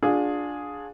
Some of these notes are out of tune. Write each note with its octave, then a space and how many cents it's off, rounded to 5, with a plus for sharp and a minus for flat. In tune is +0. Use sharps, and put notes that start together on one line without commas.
D4 +0 F4 +30 G#4 +0